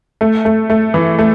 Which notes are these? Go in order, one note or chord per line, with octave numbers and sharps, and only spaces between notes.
A3
A3
A3
E3
A3